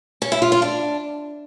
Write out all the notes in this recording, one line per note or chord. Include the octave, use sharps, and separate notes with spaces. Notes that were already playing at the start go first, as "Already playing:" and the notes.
C#4
E4
F4
F4
D4